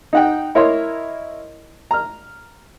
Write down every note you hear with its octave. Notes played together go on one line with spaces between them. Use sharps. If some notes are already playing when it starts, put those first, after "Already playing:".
D#4 F#5 G5
E4 A#4 C#5 D#5 C6
A#5 F6